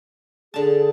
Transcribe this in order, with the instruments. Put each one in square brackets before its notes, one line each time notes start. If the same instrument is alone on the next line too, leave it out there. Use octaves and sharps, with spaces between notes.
[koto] D3 A5 [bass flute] G#4